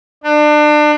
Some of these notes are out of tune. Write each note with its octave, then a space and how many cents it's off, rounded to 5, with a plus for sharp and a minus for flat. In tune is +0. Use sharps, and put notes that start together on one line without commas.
D4 +30